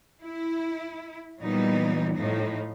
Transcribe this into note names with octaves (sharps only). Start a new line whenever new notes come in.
E4
A#2 E3 F#3 G3 B3 D#4
A2 F3 D#4